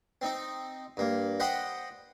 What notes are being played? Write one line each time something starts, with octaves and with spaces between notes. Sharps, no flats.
C4 D#4
G2 A#3
C5 D#5 F#5 G5 B5